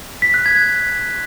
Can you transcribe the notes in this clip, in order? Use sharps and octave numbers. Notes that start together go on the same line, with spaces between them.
B6
F#6
G#6